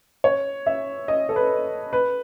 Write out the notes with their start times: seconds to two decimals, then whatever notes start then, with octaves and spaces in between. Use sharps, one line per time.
0.24 C#5
0.66 E5
1.08 D#5
1.29 A4
1.36 B4
1.93 B4